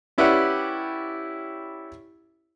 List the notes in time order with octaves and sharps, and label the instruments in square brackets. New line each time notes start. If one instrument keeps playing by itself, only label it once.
[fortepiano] C#4 E4 G4 B4 D5 F#5